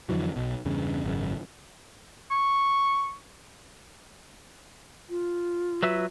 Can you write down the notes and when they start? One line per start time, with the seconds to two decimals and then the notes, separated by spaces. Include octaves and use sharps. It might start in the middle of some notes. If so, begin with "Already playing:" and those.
0.09 F2 D3 E3 F#3
0.36 B1 B2
0.65 E2 G2 C#3
1.04 G#1 F#2 C#3
2.31 C#6
5.09 F4
5.83 F#3 B4 E5